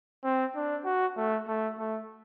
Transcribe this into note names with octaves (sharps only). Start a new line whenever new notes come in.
C4
D4
F#4
A3
A3
A3